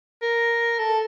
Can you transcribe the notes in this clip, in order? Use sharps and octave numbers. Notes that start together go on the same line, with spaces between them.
A#4
A4